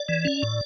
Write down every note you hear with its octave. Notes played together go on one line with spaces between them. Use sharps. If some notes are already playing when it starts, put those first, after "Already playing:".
Already playing: D5
E3
C#4
A2